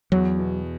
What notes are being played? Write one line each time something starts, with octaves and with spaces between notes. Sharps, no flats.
E2 F#3
B2